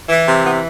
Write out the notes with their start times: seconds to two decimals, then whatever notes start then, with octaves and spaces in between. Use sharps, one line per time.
0.08 E3
0.27 C3
0.44 E3 B3